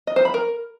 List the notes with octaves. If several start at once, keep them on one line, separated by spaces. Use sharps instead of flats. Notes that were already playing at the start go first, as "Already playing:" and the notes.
D#5
C5
B5
A#4